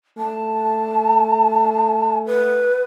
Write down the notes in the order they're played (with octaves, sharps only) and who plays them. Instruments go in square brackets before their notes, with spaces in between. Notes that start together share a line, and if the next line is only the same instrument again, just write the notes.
[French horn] A3 [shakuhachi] A5
[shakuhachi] B4